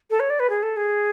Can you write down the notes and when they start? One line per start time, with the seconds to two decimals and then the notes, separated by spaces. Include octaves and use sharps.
0.10 A4
0.19 C#5
0.30 D5
0.39 B4
0.49 G#4
0.62 A4
0.76 G#4